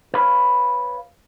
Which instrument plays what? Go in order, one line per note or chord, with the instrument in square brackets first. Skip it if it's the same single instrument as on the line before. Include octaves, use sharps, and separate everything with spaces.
[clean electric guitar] B4 C#5 F5 B5